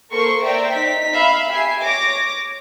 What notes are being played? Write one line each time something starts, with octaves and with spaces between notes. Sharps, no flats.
A#3 A4 A#4 C5 C6 C#6
C5 D5 E5 G5 A#5
D#4 B6
E5 F5 B5
G4 E5 G#5 C7
C#5 D6 A#6